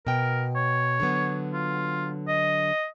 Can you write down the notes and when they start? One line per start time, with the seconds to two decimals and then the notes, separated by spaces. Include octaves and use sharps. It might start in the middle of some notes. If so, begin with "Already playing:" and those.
0.07 B2 A#4 G5
0.55 C#5
1.00 D3 F#3 B3
1.53 F4
2.28 D#5